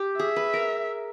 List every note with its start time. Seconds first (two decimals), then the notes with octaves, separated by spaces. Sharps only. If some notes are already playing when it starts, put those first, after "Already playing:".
Already playing: G4
0.19 G#4 E5
0.36 B4
0.54 A#4